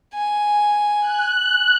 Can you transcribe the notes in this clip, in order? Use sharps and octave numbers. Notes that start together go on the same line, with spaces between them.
G#5
F#6